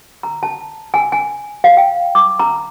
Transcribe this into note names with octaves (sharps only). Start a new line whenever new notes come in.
A#5
A5
G#5
G#5
F5
G5
D6
A#5